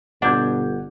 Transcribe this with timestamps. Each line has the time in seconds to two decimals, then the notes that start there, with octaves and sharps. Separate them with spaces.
0.22 G1 B2 D4 F#5 G6 G#6